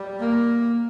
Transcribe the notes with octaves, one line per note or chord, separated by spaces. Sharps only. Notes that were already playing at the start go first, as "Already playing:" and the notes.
Already playing: G3
A#3